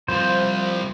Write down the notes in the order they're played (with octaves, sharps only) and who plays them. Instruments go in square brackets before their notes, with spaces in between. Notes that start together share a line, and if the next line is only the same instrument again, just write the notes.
[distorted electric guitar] C2 [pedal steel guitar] F3 C5